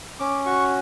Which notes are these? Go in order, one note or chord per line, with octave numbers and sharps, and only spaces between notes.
C#4 D6
F#4 C#6